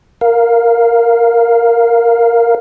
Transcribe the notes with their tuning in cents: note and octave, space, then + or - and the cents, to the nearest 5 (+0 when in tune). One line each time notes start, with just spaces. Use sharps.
A#4 +0 F5 +0